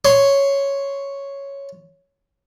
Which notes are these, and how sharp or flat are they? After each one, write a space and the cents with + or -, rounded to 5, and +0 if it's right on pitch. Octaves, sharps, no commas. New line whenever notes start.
C#5 +0 C6 -5